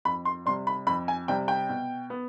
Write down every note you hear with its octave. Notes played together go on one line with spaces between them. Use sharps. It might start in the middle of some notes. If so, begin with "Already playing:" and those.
F2 B5
C6
C3 G3 C6
B5
F2 B5
G#5
C3 G3 G5
G5
B2
B3